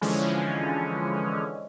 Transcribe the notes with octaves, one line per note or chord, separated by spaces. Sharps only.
D3 E3 F3 G#3 C#4